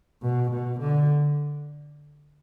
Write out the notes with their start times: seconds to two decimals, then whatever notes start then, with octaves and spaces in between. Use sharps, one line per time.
0.22 B2
0.51 B2
0.80 D3